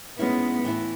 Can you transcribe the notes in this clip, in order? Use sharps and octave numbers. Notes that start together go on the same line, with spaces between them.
G#2 G#3 B3 C#4 E4
A2 E3 B3 E4